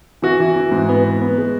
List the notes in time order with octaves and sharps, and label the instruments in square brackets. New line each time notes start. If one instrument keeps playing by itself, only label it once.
[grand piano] E3 F#4
E3
E3
G#2
B3
B3
B3
G#3